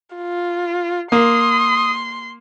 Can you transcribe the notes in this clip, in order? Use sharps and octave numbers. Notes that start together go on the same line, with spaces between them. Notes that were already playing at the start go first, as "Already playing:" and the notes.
F4
A#3 C6 D#6